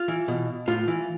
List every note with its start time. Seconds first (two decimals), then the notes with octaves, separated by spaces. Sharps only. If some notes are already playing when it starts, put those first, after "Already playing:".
Already playing: F4
0.08 E3
0.28 B2
0.68 A2 F4
0.88 E3